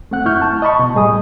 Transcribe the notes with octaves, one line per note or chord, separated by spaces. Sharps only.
A3 C4 F#5 F#6
F#2 E4 C#6 F6 G6
A5
D#5 A5 B5 C#6
B2
A2 G3 G#4 D#5 G#5 D#6